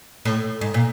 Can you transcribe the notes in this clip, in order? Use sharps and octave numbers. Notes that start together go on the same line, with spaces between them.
A2
G#2
A#2